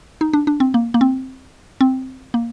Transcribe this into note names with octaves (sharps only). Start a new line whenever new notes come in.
D#4
D4
D4
C4
A#3
A#3
C4
C4
A#3